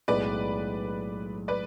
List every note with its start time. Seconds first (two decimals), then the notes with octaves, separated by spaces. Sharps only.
0.08 B1 A2 G#3 B4 D5
1.48 B4 D5